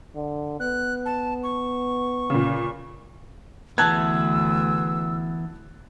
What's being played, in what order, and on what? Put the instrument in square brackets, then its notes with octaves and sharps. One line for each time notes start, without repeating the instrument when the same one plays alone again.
[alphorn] D3
[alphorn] B3 [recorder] F#6
[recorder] A5
C#6
[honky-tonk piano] A#2 C#3
[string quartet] D2 [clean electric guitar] E3 B3 [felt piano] A5 F#6 G#6 [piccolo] E6